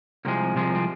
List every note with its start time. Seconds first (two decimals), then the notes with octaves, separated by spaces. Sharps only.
0.25 C2 C3 F3 G#3 A#3
0.55 C2 C3 F3 G#3
0.75 C4